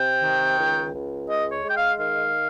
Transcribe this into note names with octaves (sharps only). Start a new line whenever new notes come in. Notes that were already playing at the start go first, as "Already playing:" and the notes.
Already playing: C3 G5
D#3
C#2
C#2
G#3 D#5
C#5
G#3
G5
F5
D#3 F5